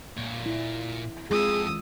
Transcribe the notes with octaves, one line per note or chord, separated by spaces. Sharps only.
A#2 C#5
E4
F2 G#3 F4 G#4 D#6 E6